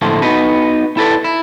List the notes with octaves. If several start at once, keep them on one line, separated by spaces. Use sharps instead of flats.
A2 D3 F3 A3 A#3
B3 D#4 F#4 B4
E4 A4 B4 D5
E4